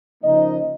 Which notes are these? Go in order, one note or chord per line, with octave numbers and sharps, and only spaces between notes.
C#3 F3 A#3 D#4 D#5